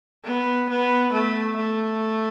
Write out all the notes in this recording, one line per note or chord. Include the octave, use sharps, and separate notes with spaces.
B3
B3
A3
A3